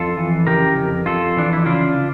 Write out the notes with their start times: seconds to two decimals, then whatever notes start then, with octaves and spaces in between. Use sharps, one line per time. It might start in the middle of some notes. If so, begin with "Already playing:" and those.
Already playing: F2 F4 A4
0.17 E3
0.47 C#3 G4 A#4
0.76 F2
1.06 F2 F4 A4
1.37 E3 D4
1.53 E4
1.66 C#3 D4 F4